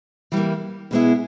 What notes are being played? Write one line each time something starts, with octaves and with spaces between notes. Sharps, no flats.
E3 G3 A#3
B2 G#3 B3 E4 G#4